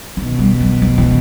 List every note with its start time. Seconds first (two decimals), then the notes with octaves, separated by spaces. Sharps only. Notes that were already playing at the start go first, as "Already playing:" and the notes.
0.17 B2 D#3
0.39 G3
0.60 F#3
0.82 F3
0.98 E3